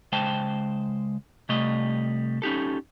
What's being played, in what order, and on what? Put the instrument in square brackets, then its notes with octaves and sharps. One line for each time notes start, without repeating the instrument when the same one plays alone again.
[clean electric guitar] C#2 G#3 C5 G5 A5
C3 G3 A3 D#5
C#4 D#4 G4 A4